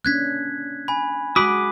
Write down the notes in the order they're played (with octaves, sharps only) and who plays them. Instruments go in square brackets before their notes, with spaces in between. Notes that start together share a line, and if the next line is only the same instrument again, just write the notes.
[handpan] A#3 C#4 D4 [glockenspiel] F#6 G#6 B6
[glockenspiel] G#5 B5
[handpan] G#3 F#4 [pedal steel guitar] B5 D6 D#6 [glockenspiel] F#6 B6